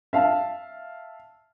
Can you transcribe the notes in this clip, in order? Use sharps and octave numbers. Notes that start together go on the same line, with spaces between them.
E5 F5 A5